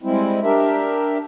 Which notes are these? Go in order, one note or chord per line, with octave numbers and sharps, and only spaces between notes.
G3 G#3 C4 E4
D4 G4 A#4 E5